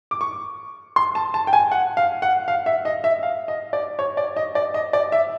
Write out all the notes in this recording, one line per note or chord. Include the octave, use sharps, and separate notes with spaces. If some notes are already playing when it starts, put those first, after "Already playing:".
D6
C#6
C6
A5
A5
G5
G#5
F#5
F5
F#5
F5
E5
D#5
E5
F5
D#5
D5
C#5
D5
D#5
D5
D#5
D5
E5